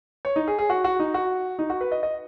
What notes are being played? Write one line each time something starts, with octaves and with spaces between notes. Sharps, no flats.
C#5
D#4
G#4
G#4
F#4
F#4
D#4
F#4
D#4
F#4
B4
D#5
D#5